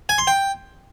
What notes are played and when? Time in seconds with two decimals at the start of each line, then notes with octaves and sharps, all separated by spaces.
0.09 G#5
0.18 C6
0.27 G5